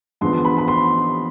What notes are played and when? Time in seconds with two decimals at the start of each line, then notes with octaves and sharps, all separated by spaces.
0.21 E2 D3 F3 B3 C6
0.45 B5
0.58 B5
0.68 C6